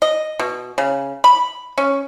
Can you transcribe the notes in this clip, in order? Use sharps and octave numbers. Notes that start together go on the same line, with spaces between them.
D#5
B2
C#3
B5
C#4